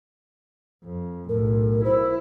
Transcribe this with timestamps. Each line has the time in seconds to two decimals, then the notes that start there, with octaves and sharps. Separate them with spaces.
0.84 F2
1.29 B1 A2 A#4
1.84 E4 C5